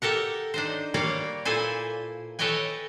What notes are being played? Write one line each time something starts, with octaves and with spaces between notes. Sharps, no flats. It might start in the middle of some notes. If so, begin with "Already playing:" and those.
G4 A4 A#4 F#5
D4 D#4 C5
G3 A#3 C#5 D5 F5
A#2 E4 A4 C5 G#5
A4 B4 C#5 D#5 G5 G#5